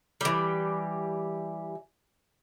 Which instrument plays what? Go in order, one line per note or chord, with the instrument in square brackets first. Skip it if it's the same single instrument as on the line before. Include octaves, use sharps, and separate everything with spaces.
[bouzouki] E3 G3